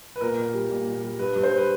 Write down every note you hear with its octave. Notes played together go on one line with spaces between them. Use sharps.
B4
A#2 A#4
A#2
G3
A#2
A#2
G3
G2 B4
G2
C5
B4